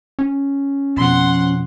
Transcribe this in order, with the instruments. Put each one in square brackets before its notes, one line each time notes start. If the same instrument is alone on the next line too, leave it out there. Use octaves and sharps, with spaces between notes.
[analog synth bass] C#4
[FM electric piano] F2 B2 F3 [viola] F#5 C6